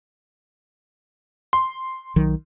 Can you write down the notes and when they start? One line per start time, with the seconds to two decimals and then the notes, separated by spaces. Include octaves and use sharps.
1.53 C6
2.16 B1 D#3 F#3